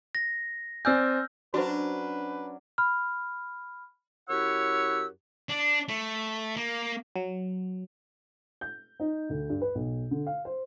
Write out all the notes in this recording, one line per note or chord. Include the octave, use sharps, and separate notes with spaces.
A#6
C4 D5 G#5 E6 F6 G6
F#3 C#4 D4 F#4 B4 C5
B5 F6
F#2 E4 G4 C#5 F#5 E6
D4
A3
A#3
F#3
G6
D#4
D2
G2
B4
B1
D3
F5
C5